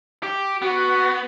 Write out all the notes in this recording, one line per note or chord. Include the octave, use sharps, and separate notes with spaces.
G4
B3 F#4